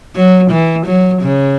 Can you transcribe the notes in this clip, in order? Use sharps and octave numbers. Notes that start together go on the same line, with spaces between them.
F#3
E3
F#3
C#3